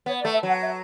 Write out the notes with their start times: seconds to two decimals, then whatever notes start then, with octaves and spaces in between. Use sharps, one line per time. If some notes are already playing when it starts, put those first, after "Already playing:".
0.06 B3 C#5
0.21 D5
0.25 A3
0.34 E5
0.43 F#3 F#5
0.62 E5